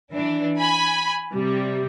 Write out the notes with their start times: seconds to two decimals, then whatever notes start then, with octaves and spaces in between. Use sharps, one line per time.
0.15 E3 D4
0.60 G#5 B5
1.34 C3 G3